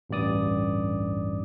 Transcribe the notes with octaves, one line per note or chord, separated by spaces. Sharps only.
A1 D2 G2 D5 D#6